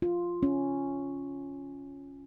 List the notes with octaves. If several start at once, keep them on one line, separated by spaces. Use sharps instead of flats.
F4
C#4